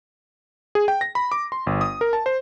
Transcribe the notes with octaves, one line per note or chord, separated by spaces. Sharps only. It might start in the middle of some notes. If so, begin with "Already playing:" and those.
G#4
G5
A#6
B5
D6
C6
G1
D#6
A#4
A5
C5